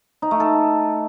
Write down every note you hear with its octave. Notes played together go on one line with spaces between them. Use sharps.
D#4
A3
A4